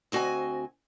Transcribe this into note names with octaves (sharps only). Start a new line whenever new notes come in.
D2 C4 F#4 D#5 G#5